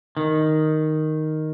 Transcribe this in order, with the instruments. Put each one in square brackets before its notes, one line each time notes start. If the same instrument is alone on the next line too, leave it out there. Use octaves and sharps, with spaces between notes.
[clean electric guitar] D#3